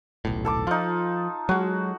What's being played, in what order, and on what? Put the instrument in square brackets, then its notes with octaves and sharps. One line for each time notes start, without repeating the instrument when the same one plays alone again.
[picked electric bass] D#1 B1 A2
[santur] A4 A5 D6
[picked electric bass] F3 [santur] D#4 F4
[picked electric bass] F#3 G#3 [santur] F#4